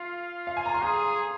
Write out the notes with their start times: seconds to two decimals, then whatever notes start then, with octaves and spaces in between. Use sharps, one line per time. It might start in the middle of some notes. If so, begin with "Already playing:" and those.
Already playing: F4 F5
0.47 F5
0.57 G#5
0.66 A#5
0.74 C6
0.83 G#4 A#5